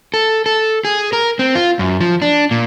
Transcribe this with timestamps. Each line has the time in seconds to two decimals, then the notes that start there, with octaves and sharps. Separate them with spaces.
0.14 A4
0.46 A4
0.85 G#4
1.13 A#4
1.39 C4
1.55 F4
1.79 F#2
2.01 F3
2.22 D4
2.51 A#2